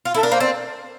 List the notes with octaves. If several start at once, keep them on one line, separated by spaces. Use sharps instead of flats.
F4
E4 A4
D4 A#4
A#3 C5
C4 D5